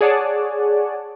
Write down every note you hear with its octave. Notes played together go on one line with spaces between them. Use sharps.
G#4 C#5 D5 F#5 G#5 A5